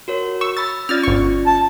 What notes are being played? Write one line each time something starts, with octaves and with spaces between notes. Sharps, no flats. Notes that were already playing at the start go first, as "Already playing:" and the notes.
F#4 A#4 C#5
C#6 E6
B5 E6 A6
C#4 F4 D5 F6 A6
G1 C#6
A5